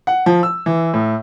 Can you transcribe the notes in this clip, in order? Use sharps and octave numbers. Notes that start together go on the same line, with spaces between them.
F#5
F3
E6
E3
A2